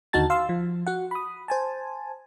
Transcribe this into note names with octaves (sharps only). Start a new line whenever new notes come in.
D#2 D3 D#4 F#4 A5 A6
F5 C6 E6
F3
F#4 F#5
B5 D#6
C5 G#5 A5